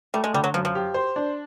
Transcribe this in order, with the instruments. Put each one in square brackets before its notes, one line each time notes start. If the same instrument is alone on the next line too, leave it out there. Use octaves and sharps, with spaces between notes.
[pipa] G3 [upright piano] A3
[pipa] G#3
[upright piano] D3 [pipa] G3
[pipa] F#3
[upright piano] F#2 [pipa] F3
[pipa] F3
[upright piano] G4
C5
D4